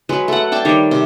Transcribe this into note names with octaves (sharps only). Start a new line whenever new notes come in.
F#3 G#3 B4
A3 F#5
D4 G5 A5 D6
D#3 G3 C#5
C3